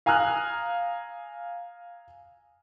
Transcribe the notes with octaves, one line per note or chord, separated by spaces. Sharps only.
F5 G#5 A#5 D#6 F6 F#6